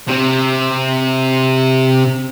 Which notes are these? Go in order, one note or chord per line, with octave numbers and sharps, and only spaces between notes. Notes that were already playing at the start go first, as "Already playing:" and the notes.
C3 C4